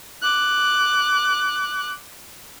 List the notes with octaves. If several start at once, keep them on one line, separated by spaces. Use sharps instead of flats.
D6 F#6